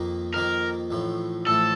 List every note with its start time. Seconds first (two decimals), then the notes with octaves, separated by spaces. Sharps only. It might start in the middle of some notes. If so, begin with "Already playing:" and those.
Already playing: F2 D#3 A#3
0.34 F2 D#3 A#3 A#4
0.91 A1 A2 F3
1.47 A1 A2 F3 A4